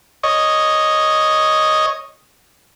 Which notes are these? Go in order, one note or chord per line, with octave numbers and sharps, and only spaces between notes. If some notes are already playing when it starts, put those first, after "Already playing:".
C#5 D#5